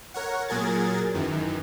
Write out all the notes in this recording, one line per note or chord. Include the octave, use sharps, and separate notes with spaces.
A#4 C#5 F#5
A#2 F#3 G#4 A#4 G#6 A6
F#2 D#3 E3